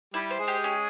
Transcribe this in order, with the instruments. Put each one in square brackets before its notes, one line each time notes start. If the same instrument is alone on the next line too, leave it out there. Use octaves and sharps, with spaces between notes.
[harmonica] G3 G4 [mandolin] E4
[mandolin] C5
[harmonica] G#3 G#4
[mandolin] G4
C#4